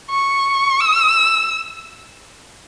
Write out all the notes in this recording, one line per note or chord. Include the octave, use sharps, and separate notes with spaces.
C#6
E6